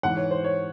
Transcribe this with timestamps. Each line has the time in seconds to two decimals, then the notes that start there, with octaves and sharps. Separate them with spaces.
0.03 G#2 E3 F#5
0.17 C#5
0.31 C5
0.44 C#5